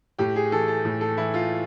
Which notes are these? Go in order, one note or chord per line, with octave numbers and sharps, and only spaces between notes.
A2 G4
G#4
E3 A4
A4
A2
A4
E3 E4
F4